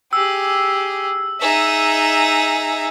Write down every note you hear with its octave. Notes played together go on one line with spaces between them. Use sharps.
G4 G#4 E6
D#4 G#4 E5